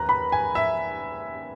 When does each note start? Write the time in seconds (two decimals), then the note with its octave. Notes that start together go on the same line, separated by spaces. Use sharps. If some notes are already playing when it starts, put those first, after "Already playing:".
Already playing: D#2 B4 A#5
0.09 B5
0.32 G#5
0.55 E5